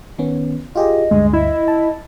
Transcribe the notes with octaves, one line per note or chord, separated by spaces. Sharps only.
D#3 B3 C#4
F4 G4 G#4 D#5
D2 G2 G#3
E4 D#5
A5